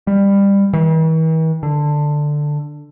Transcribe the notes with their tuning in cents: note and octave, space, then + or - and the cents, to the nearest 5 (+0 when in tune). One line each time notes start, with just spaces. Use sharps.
G3 +20
E3 -45
D3 +10